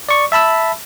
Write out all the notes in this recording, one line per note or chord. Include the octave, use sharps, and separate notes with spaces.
D5 C#6
E5 A5 B5 E6